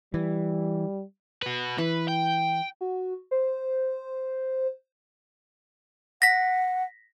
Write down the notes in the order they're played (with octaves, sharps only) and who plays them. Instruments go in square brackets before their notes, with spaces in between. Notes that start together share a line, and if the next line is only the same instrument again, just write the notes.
[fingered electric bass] E3 [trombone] G3
[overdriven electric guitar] F#4 B4
[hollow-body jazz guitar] E3 [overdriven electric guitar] B4
[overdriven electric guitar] G5
[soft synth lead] F#4
C5
[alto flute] F#5 [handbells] A#6 B6